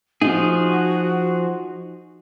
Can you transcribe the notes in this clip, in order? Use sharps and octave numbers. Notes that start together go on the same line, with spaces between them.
F3 D#4 F#4 G#4